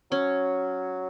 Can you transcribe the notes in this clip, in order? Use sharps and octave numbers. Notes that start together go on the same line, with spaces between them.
F#3 C#4